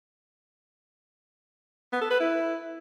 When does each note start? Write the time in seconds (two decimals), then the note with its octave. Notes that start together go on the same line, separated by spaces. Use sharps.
1.93 B3
2.02 A4
2.11 B4
2.20 E4